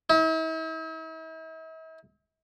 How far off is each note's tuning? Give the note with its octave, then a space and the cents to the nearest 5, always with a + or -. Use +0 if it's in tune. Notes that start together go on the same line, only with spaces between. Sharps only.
E4 -45